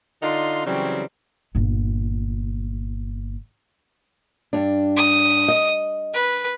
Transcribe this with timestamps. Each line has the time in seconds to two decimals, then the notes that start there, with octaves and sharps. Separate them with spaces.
0.23 D3 D4 D#4 F4 C6
0.65 C#3 E3 F#3 G3 C4
1.55 G1 A#2
4.53 G2 D4
4.96 D#6
5.48 D#5
6.14 B4